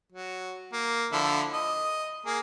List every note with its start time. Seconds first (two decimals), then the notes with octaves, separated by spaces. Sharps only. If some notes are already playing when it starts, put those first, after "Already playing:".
0.12 F#3
0.73 A#3
1.12 D3 F3 E4
1.53 D#5
2.26 A#3 G#4